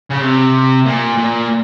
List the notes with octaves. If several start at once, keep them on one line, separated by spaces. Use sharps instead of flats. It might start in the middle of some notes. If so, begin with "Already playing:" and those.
C#3
C3
A#2
A#2